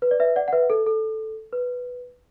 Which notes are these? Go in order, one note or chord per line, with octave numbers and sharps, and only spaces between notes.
B4
D5
B4 E5
D5 F#5
F#5
B4 E5
A4
A4
B4